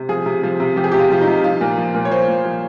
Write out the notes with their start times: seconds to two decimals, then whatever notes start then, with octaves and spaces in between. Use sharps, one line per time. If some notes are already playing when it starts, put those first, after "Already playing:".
Already playing: C3
0.09 F3 G#4
0.26 C3
0.43 F3
0.60 C3
0.76 F3 G4
0.84 G#4
0.92 G4
0.94 C3
0.99 F4
1.11 F3 F4
1.21 D#4
1.27 C3
1.44 F3 F4
1.61 A#2
1.78 F3
1.95 A#2
2.05 C#5
2.11 F3 C5
2.28 A#2
2.46 F3